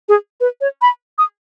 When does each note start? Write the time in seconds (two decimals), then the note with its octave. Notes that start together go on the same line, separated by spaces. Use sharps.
0.09 G#4
0.40 B4
0.61 C#5
0.82 B5
1.18 D#6